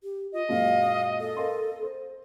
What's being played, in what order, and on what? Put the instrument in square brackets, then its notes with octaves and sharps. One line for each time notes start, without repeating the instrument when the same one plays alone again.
[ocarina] G4
[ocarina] F4 [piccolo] D#5
[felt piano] F#2 A#2 G#3 [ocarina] F5
[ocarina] A4
[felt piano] A#4 F5 C6
C5